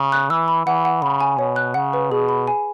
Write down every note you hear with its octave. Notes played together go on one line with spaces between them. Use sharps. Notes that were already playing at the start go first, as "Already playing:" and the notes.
Already playing: C#3
F#6
E3 E6
B5
E3 F#5
F#5
C#3 B5
G#5
B2 C#5
F#6
C#3 F#5
B4
B2 G#4
B5
G#5